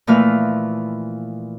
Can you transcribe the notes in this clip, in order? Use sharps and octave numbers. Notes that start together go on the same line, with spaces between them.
A#2 E3 F3 A3 B4 F6